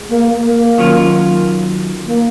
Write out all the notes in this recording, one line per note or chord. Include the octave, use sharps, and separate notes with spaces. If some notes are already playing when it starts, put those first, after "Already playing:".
Already playing: G#3
A#3
A#3
D#3 F#3 C#4 F4
A#3